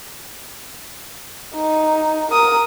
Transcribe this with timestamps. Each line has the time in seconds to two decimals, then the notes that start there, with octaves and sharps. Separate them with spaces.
1.55 D#4
2.32 A#4 D#6